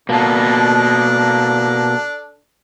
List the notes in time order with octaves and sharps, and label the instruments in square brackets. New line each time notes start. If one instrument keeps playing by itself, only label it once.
[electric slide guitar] B2 A#3 [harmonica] D4 A4